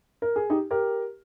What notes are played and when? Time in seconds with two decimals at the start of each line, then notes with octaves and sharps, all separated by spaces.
0.22 A#4
0.36 G#4
0.50 D#4 G4
0.71 G4 A#4